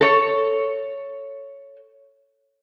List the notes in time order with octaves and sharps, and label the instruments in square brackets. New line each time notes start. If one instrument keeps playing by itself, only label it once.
[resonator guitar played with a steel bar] A4 C#5